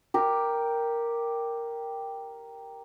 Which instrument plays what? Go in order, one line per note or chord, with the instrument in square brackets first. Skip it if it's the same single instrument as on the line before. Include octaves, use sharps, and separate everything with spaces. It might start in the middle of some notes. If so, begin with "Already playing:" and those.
[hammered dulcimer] G4 A#4